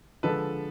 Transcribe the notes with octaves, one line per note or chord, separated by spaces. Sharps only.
D3 F3 G#3 A4 B4